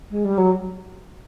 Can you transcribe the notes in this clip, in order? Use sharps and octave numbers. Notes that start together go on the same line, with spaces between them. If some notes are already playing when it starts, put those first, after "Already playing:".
G#3
G3
F#3